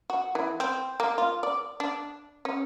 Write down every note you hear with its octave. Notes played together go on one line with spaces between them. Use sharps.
F#4
E3
C4
A#3
F4
D5
D4
C#4